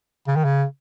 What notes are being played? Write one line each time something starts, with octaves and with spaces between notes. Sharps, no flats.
C#3
D#3
C#3